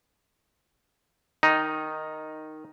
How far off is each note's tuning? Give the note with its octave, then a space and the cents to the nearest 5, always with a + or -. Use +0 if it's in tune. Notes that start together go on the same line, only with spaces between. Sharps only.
D#3 -5 D#4 +0